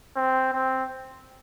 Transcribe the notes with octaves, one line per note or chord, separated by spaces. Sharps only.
C4
C4